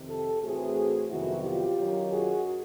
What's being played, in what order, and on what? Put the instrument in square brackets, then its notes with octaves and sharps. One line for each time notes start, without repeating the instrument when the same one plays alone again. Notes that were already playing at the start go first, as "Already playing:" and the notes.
Already playing: [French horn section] F2 C3 D#3
G4 A4
A2 E3 A3 C4 F#4 G#4
F2 C3 D#3 F#3 B3 E4 F#4
F4 G4
F#2 D#3 F#3
F#4 G#4